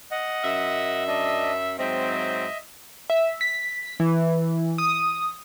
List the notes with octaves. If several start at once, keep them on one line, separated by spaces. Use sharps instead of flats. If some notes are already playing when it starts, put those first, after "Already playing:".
D#5 F#5
F#2 E5
D4 D#5
G#2 F#3 C4 D#5 E5
E5
B6
E3
D#6